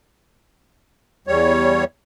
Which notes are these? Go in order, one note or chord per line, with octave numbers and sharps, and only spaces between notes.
E2 G3 C#5